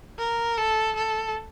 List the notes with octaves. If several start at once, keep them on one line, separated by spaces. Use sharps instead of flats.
A#4
A4
A4